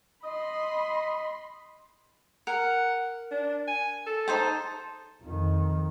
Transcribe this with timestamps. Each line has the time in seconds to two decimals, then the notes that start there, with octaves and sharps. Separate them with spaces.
0.24 D#5 B5 C6
2.47 A#4 F#5
3.31 D4
3.67 G#5
4.07 A4
4.28 D#4 C5 A5
5.23 F2 D#3